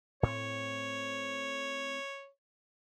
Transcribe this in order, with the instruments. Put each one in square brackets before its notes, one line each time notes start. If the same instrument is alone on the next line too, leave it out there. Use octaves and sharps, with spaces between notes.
[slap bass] A2 C4 [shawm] C#5